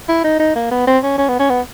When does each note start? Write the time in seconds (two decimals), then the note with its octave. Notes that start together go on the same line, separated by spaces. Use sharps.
0.09 E4
0.24 D#4
0.40 D#4
0.55 A#3
0.71 B3
0.87 C4
1.03 C#4
1.18 C#4
1.28 B3
1.40 C#4
1.50 B3